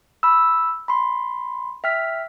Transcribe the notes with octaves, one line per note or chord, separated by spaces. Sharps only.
B5 E6
B5 C6
E5 G5 F6 B6